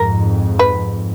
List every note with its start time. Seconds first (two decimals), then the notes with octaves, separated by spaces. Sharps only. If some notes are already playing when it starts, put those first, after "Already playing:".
Already playing: F2 G#2 A#4
0.59 B4